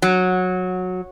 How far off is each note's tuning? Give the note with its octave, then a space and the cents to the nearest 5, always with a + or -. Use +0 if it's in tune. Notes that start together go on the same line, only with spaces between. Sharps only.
F#3 -15